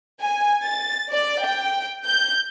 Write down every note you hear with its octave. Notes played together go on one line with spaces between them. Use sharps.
G#5
A6
D5
G5
G6